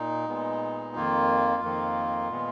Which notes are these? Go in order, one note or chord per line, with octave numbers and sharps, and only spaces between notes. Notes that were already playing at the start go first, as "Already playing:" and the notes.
Already playing: A#2 D#4
A#2 G#3 B3
F2 D#3 A#3 F4
F2 D#3 A#3
A#2 G#3 B3